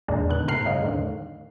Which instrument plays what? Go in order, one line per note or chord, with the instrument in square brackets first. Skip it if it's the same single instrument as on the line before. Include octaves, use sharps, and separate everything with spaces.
[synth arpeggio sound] E2 A#2 D#3 G#3 A#3 D4
D3 D#3 B3 F#6
A2 C3 A#4 F6 F#6 C7
G2 C#3 D#5 F5
E2 A2 D3 D#3